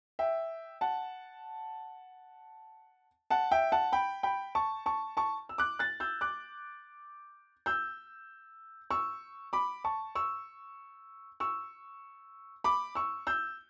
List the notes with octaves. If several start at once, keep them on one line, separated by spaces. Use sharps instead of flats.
E5 G5
F#5 A5
F#5 A5
E5 G5
F#5 A5
G5 B5
G5 B5
A5 C#6
A5 C#6
A5 C#6
E6
D6 F#6
F#6 A6
E6 G6
D6 F#6
E6 G6
C#6 E6
B5 D6
A5 C#6
C#6 E6
C#6 E6
B5 D6
C#6 E6
E6 G6